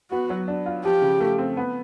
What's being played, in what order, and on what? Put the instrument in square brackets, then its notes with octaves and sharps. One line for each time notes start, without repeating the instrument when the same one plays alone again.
[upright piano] B3 [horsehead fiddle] F#4
[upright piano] F#3
D4
F4
[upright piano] F3 [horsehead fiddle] G4
[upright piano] C#3
A3
C4
B3